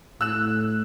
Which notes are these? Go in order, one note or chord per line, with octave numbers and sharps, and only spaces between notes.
A2 E6 F#6 E7